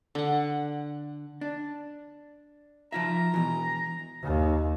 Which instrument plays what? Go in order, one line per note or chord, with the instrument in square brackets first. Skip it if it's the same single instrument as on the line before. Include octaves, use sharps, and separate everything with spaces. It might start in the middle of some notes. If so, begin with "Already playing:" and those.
[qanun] D3 F#5
[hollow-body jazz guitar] D4
[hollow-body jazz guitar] F3 F4 E5 [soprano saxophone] A#5
[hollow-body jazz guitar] B2 E3
[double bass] D#2